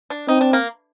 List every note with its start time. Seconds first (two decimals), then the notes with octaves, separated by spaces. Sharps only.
0.10 D4
0.28 C4 D#4
0.41 D4
0.53 A#3